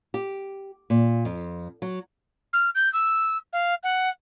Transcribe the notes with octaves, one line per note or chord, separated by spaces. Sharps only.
G4
A#2
F2
F#3
F6
G6
E6
F5
F#5